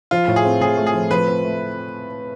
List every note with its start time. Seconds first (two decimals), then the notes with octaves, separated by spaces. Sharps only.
0.11 F3 F4
0.28 A2
0.36 G#4
0.45 C4
0.61 A2 G#4
0.78 A3
0.87 G#4
0.94 F3
1.11 F3 B4
1.28 C4
1.45 A3